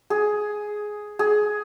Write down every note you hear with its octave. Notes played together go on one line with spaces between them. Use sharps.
G#4
G#4